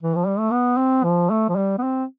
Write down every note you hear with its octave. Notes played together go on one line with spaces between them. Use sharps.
E3
F3
G3
A3
B3
C4
F3
A3
F3
G3
B3
C4